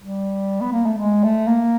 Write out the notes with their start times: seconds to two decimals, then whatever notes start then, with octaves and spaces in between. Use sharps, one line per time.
0.01 G3
0.61 B3
0.73 A#3
0.86 A3
0.99 G#3
1.24 A3
1.48 A#3